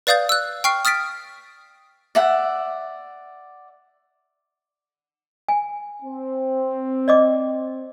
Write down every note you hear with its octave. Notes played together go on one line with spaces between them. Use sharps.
B4 D5 F5 D#6 G6 A6
E6 F#6
G5 C#6 F6 C7
D#6 F6 A6 B6 D7
D5 E5 F#5
G#5
C4
D5 D#5 D6